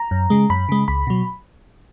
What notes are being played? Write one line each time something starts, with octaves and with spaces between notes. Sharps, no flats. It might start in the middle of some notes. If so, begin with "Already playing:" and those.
Already playing: A#5
F#2
C#3 G#3
F#2 B5
C#3 G#3
C#2 B5
B2 F#3